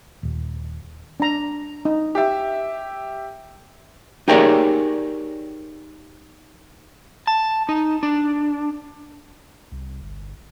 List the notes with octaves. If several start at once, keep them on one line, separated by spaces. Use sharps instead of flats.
D#1
D4 A#5
D#4
G4 E5
D#4 G4 G#4 A#4 C#5 D5
A5
D#4
D4
C2
G1